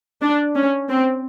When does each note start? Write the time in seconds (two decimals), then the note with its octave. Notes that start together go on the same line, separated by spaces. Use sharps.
0.22 D4
0.56 C#4
0.89 C4